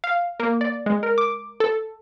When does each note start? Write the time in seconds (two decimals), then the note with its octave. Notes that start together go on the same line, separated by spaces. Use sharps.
0.04 F5
0.40 A#3
0.61 D5
0.86 G#3
1.03 A#4
1.18 D6
1.60 A4